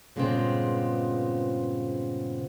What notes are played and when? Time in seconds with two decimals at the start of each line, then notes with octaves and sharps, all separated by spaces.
0.16 G2 A#2 C#3 G#3 B3 C4